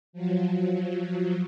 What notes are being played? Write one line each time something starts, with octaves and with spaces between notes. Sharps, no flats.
F3 F#3